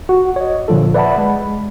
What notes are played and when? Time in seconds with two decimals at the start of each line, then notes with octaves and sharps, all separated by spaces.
0.09 F#4
0.36 C#5 D#5
0.68 A#2 D3 F3 F4 A4
0.94 B4 D5 E5 F#5 A5 B5
1.18 G#3